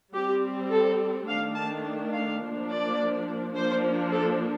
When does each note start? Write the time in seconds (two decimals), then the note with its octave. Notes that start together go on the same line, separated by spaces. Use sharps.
0.14 G3 C4 G4
0.71 A4
1.27 D#3 A3 D4 F5
1.56 A5
2.13 F5
2.42 F3 A#3 D4
2.70 D5
3.55 F3 A#3 D4 C5
4.13 A4